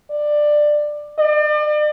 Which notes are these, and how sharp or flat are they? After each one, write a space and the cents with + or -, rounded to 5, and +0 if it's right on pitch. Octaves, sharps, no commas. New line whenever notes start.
D5 +15
D5 +40